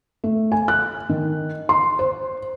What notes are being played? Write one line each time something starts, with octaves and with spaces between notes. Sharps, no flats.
A3
G#5
F#6
D#3
C6
C5